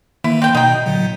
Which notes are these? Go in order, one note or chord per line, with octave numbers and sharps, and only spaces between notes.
D#3 E3 A#3 E4
C4 G5
B2 D#4 G5
A#2 D3 F#3